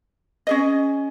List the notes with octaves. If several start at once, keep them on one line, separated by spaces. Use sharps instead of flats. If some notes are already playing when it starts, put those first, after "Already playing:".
C#4 G#4 D#5